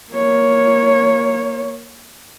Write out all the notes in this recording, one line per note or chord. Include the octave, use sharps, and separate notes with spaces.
A#3 C#5